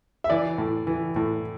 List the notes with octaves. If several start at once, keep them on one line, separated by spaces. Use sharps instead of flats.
E5
E3 D5
A2
E3
A2